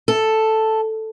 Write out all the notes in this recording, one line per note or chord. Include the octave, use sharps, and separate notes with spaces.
A4